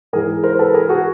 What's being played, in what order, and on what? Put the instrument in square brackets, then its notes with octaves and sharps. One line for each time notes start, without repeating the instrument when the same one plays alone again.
[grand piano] G#2 E3 G#4 A#4
A#4 C5
A4 B4
G#4 A#4
F#4 G#4